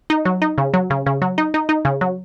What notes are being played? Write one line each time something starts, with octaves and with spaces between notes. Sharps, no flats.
D#4
F#3
D#4
C#3
F#3
C#3
C#3
F#3
D#4
D#4
D#4
C#3
F#3